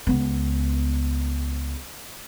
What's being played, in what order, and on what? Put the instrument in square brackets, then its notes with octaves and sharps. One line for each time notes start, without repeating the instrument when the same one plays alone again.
[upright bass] C#2 B3